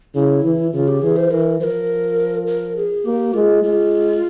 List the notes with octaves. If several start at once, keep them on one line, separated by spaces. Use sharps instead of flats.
C#3 E4
E3
C#3 F4
G4
E3 G#4
C5
E3 A#4
F3 A#4 C5
A#4
G#4
A#3 G4
G#3 F4
G#3 F4